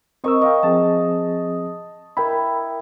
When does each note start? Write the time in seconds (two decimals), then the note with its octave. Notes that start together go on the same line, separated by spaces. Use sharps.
0.24 C4 A#4 D#5 C#6 E6
0.42 A#4 D#5 F5 G5
0.63 F3 C4 G#4 A5
2.17 E4 A#4 G5 B5